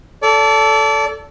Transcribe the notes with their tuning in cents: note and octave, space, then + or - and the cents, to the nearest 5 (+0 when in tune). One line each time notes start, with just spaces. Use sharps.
A4 +0 D5 -30